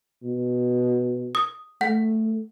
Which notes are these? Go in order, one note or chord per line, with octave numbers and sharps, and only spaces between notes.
B2
D#6
A3 F#5